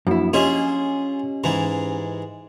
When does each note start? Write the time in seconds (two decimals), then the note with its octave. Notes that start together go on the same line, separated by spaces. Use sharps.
0.07 F#2 F3 A#3 D4 E4
0.33 C#4 F4 G4 G#4 D#5 E5
1.44 G#2 E3 G#3